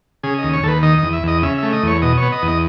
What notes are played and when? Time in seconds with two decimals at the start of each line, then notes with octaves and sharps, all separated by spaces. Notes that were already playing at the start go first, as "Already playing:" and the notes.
0.23 C#3 G#4
0.38 D#2 D#5
0.53 C#5
0.63 D#2 A4
0.68 B4
0.83 D#3 D#5
0.98 E2 D#5
1.13 E5
1.23 E2 D#5
1.43 C#3 E5
1.58 A3 E5
1.73 D#5
1.83 E2 C#5
2.02 B2 D#5
2.17 C#5
2.22 B3
2.32 D#5
2.42 E2
2.48 D#5